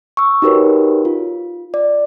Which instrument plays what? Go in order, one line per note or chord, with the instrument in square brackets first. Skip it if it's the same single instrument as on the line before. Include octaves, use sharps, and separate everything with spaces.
[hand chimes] C#6 E6
D#4 F#4 G4 A#4 B4 C#5
F4
D5